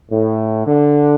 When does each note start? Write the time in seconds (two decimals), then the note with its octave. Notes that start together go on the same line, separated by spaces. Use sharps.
0.11 A2
0.66 D3